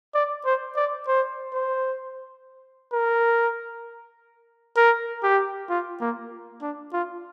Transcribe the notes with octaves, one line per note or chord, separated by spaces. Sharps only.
D5
C5
D5
C5
C5
A#4
A#4
G4
F4
A#3
D4
F4